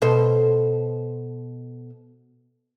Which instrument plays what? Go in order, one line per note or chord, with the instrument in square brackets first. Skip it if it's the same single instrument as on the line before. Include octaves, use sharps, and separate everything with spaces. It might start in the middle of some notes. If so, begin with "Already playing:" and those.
[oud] B2 A4 C5